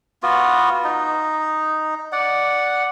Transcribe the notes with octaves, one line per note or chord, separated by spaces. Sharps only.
B3 F4 F#4
D#4
D5 F#5